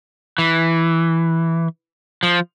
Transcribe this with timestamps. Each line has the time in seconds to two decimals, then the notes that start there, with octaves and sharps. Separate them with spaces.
0.38 E3
2.23 F3